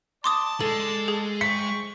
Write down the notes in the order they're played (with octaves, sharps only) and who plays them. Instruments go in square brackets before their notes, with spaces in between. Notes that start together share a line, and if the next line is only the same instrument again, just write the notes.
[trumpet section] D5 A5 [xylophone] C6 D6 D#6
[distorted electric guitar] G#3 [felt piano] A4 [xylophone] F#7
[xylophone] G#4
[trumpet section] C5 G5 C#6 [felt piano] B6 [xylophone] C#7